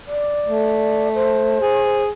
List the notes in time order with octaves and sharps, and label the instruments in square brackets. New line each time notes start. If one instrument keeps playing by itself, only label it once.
[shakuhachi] D5
[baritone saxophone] A3
[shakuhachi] C5
[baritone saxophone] G#4